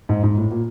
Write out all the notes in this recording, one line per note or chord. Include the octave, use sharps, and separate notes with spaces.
G#2
G#2
A2
A#2